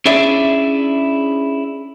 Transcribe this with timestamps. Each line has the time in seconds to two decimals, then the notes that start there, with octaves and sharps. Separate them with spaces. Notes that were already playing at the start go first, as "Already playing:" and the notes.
0.06 C#4 D4 E4 G#4 D5 E5